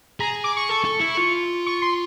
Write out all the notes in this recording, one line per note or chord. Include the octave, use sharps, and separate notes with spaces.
G#4 A#5
D6
C#6
A4
A4
E4
F4
C#6
C6